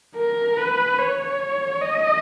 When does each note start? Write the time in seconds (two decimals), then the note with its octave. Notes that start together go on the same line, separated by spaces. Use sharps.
0.16 A#4
0.57 B4
0.99 C#5
1.82 D#5